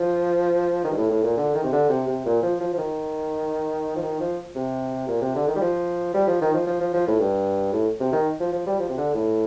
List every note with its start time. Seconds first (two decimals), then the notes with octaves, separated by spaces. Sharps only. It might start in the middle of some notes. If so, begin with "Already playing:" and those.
Already playing: F3
0.84 D#3
0.91 G2
0.97 A2
1.10 A2
1.23 A#2
1.37 D3
1.54 D#3
1.63 C3
1.72 D3
1.89 C3
2.07 C3
2.25 A#2
2.42 F3
2.60 F3
2.73 F3
2.78 D#3
3.96 F3
4.02 D#3
4.20 F3
4.55 C3
5.08 A#2
5.21 C3
5.35 D3
5.48 D#3
5.56 G3
5.61 F3
6.14 G3
6.27 F3
6.41 D#3
6.53 F3
6.67 F3
6.81 F3
6.94 F3
7.07 A2
7.20 G2
7.73 A2
8.00 C3
8.12 D#3
8.40 F3
8.52 F3
8.66 G3
8.80 F3
8.89 C3
8.97 D3
9.14 A2